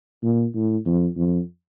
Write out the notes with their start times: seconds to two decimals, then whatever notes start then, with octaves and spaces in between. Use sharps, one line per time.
0.23 A#2
0.55 A2
0.86 F2
1.17 F2